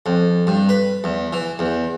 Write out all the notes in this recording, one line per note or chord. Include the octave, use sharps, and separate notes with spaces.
F2
G2
B4
E2
E3
E2